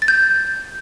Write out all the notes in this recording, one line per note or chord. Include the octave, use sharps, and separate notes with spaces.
A6
G6